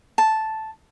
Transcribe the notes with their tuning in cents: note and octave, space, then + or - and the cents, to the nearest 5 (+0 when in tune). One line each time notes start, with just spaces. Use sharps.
A5 -5